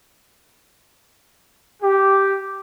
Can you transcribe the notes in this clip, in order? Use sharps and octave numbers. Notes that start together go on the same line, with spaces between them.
G4